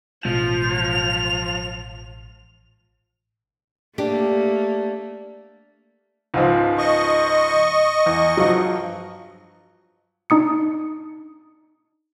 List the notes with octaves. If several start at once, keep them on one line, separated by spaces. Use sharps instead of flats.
A1 B2 F3 G#3 F7
A3 A#3 D4 G4
C#2 G#2 F3
D#5 C#6
E2
G2 F3 F#3
D4 D#4 D#6 C#7